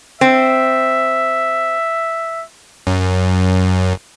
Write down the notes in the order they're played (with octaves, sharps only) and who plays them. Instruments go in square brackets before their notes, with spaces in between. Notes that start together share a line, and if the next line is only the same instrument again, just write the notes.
[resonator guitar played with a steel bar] C4 [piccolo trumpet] E5
[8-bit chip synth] F#2